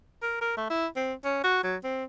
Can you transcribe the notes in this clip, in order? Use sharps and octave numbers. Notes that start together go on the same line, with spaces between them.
A#4
A#4
A3
E4
C4
C#4
F#4
F#3
C4